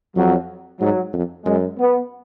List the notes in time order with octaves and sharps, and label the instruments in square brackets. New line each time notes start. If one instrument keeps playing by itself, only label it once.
[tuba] F2 [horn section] F#3
[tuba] G#2 [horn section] F#3
[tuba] F2
[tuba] F#2 [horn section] G#3
[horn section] B3